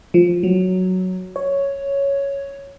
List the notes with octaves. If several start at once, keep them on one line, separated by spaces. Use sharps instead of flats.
F3
F#3
C#5